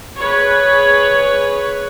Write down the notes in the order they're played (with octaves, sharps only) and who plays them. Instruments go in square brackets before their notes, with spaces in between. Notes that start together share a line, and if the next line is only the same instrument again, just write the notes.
[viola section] G#4 B4 C#5